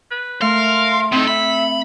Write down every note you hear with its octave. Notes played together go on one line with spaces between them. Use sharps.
B4
A3 A#4 F5 C6
A2 C4 D#4 A4
E5 B5